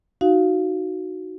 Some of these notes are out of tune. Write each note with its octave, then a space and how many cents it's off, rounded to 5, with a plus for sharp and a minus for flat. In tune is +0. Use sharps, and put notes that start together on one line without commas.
D#4 +0 F#4 +0 F5 +0